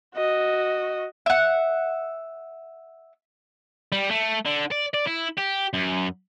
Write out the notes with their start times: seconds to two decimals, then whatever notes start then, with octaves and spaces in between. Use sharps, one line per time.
0.15 F#4 D#5
1.26 E5 F#5
3.92 G3
4.11 A3
4.46 D3
4.71 D5
4.94 D5
5.07 E4
5.37 G4
5.73 F#2